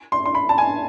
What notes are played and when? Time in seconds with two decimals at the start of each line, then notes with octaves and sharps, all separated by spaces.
0.12 C6
0.26 C6
0.35 B5
0.49 A5
0.58 G#5